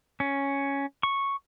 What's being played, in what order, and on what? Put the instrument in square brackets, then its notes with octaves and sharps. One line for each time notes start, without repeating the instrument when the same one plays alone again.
[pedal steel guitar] C#4
C#6